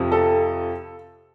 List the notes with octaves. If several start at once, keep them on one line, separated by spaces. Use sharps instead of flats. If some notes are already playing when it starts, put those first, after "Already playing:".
Already playing: F2 C3 F3
A4